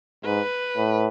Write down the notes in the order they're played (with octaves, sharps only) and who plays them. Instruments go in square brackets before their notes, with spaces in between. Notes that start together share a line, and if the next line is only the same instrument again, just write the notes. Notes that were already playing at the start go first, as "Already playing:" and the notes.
[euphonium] G#2 [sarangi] B4
[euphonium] A2